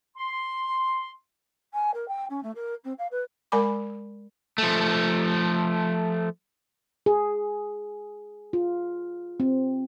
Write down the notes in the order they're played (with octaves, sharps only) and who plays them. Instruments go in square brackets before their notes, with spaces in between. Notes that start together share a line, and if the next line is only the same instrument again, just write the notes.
[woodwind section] C6
[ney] G#5
A#4
G5
C#4
A3
A#4
C4
F5
B4
[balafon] G#3 A#4 D5 G#5 B5 D6
[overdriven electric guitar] F3 A3
[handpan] G#4
F4
C4